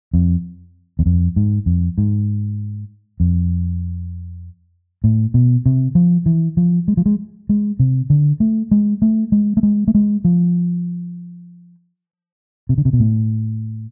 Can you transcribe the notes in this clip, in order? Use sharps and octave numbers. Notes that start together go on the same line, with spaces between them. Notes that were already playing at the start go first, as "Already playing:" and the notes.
F2
E2
F2
G#2
F2
G#2
F2
A2
B2
C3
F3
E3
F3
G#3
F3
G#3
G#3
C3
D3
A3
G#3
A3
G#3
A3
G#3
A3
G#3
F3
C3
D3
C3
B2
A2